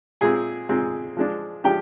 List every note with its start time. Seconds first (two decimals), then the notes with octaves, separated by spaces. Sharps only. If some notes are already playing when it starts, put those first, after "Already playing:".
0.21 A#2 G#3 C4 G#4 G#5
0.69 A#2 G#3 C4
1.17 F3 G#3 D4
1.64 F3 G#3 D4 G4 G5